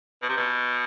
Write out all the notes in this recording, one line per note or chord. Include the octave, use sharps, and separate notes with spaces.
B2
C3
B2